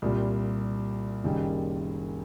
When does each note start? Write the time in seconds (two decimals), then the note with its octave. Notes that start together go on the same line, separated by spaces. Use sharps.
0.02 C2 A#2 G3
1.23 F#1 F#2 D#3 G3